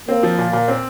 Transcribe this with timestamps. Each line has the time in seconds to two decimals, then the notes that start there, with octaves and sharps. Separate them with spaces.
0.09 A#3 C4
0.23 F3
0.38 A#2
0.53 A#2
0.68 C4